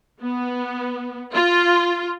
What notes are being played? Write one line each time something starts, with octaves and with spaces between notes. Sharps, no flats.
B3
F4